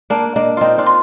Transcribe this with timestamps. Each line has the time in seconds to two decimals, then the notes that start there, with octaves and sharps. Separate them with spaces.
0.10 A#3 D4 A5
0.36 A#3 D4 D#5
0.57 C4 D#4 F4 D#5
0.78 D4 F4
0.87 C6